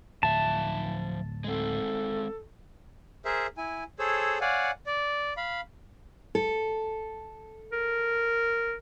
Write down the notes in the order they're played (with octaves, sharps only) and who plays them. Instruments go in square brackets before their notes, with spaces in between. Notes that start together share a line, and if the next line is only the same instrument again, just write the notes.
[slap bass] D1 [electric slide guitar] F3 E5 [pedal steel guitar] A5
[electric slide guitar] G#3 C4 [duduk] A4
[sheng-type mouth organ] G#4 A#4 C5 E5
E4 G#5
G#4 A4 C5 C#5 E6
C#5 D5 F5 F#5 G#5
D5
F5 B5
[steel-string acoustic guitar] A4
[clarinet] A#4